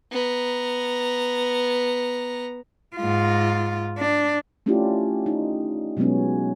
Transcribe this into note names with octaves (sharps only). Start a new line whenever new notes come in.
B3 A#5
G#2 F4
D4
A3 C#4 D4 E4 F4 G4
D#4
B2 F#3 G#3 B3 C#4